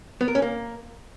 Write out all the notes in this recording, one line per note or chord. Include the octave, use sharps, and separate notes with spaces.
B3
A#4
C#4
A#3